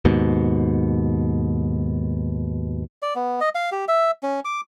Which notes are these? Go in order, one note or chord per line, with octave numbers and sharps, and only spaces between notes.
D#2 G#2 B2
D5
B3
D#5
F5
G4
E5
C#4
D6